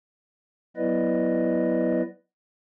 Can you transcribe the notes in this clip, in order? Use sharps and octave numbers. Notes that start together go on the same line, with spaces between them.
F#3 B3 E4 B4 D5 D#5